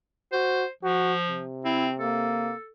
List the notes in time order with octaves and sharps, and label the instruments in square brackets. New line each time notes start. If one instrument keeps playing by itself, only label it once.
[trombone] F#4 [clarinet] C5
[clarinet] F3 [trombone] F#4
[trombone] C3
[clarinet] C4 [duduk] E4
[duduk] A#3 [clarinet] A4